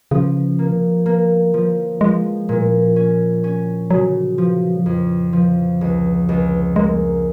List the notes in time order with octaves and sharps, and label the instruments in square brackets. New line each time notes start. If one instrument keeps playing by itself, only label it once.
[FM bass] C#3 [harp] F3
[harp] A#3
A#3
F3
[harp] F3 [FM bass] G#3
[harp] A#2
C#4
C#4
[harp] C#3 [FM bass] F#3
[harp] F3
F2
F3
C#2
C#2
[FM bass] G#3 [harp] A#3